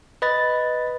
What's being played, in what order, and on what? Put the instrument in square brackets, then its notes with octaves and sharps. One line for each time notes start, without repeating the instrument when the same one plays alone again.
[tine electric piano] B4 D#5 B5 A6